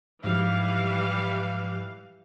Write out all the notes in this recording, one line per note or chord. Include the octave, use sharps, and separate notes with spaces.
G#2 E3 F3 G3 F5